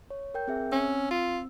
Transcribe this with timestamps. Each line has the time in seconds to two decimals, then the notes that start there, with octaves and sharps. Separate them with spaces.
0.10 C#5
0.34 A#4 G5 G6
0.48 C4 G#4 E5
0.72 C4 C#4 E6
1.11 F4